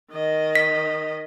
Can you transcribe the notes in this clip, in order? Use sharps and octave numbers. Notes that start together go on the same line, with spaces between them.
D#3 D#5
B6